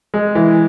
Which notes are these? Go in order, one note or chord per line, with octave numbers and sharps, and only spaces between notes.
G#3
E3